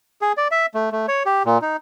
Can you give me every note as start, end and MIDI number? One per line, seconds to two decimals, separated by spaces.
0.22 0.32 68
0.37 0.48 74
0.51 0.66 76
0.74 0.90 57
0.92 1.06 57
1.08 1.23 73
1.26 1.43 67
1.46 1.58 46
1.62 1.76 63